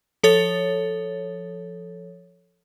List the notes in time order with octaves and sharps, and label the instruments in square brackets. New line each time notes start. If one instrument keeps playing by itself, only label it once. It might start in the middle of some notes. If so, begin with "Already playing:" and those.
[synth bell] F3 A4 C#5 A6